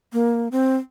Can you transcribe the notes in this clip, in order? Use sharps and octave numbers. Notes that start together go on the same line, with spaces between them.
A#3
C4